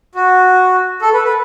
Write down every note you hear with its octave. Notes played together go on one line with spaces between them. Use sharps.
F#4
A4
B4
B4